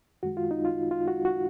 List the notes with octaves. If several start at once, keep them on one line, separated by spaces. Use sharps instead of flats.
F#2 D#3 G#3 F#4
F4
D#4
F4
F4
F#4
F#4